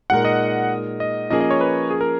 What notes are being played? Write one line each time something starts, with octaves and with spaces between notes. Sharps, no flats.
A#2 G#3 D#4 A#4 F#5
D#5
D#5
F3 A#3 C#4 G#4 D#5
D#5
C#5
B4
G#4
A#4